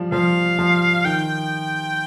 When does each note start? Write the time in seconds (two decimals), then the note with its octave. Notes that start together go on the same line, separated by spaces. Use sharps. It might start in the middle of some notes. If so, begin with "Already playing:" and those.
Already playing: F3 G3
0.12 F3 F5
0.59 F3
1.05 D#3 G5